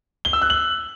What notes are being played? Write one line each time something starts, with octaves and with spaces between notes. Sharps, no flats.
G7
E6
F#6
F#7